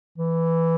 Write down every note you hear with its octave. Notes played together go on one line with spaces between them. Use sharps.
E3